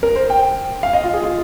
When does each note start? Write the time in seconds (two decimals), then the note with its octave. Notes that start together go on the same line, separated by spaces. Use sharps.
0.03 A#4
0.16 C5
0.30 G5
0.83 F5
0.93 D#5
1.04 F4
1.14 G#4
1.24 F4